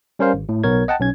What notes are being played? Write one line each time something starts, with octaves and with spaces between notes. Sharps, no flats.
G3 C#4 A#4 C5 F5
G#1
A2
B1 B3 A#4 C#5 G#6
D#5 F#5 G5 A5
B1 C#4 G#6